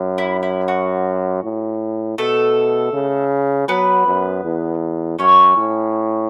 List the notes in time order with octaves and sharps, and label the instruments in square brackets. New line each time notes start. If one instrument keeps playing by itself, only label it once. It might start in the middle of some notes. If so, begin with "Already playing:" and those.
Already playing: [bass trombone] F#2
[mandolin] E4
E4
F#4
[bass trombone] A2
[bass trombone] B2 [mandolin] A3 A4
[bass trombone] C#3
[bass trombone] F#3 [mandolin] B3 B4
[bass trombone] F#2
E2
[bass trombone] F#2 [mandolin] C#4 C#5
[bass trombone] A2